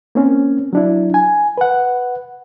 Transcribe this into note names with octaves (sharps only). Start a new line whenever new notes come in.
A#3 C4 C#4
F#3 D4 E4
G#5
B4 F#5